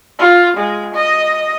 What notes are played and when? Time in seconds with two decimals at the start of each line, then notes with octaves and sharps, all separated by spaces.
0.19 F4
0.57 G#3
0.94 D#5